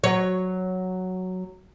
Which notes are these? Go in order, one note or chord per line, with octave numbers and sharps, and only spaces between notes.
F#3 C#5